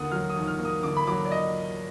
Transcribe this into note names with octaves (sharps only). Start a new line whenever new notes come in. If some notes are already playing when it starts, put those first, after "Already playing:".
Already playing: D#2 D3 A#3 F#5 D#6
F#3 F6
D#6
D#2
F6
A#3
D#6
D3 D6
B5
F#3 D6
D5
D#5